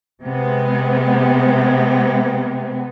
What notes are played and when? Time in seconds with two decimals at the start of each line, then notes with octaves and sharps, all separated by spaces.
0.23 C3 G#3 B3